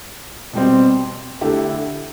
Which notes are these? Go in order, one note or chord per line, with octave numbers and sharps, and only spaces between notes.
B2 G3 C4
D3 A3 E4 G4